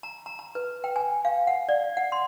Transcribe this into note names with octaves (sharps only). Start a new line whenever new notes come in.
A#5
A#5
A#5
B4
G5
G#5
F5
F#5
D5
F#5
C6